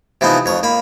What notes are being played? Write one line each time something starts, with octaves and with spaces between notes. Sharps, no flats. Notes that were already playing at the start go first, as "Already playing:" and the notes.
C3 E3 F3 B3 D#4
F2 C#5
A#3 B5